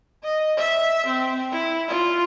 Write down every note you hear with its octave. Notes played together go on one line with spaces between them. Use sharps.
D#5
E5
C4
E4
F4